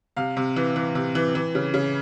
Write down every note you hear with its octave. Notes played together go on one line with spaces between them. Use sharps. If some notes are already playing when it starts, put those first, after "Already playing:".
C3 F5
C3
E3
E3
C3
E3
E3
C#3
C#3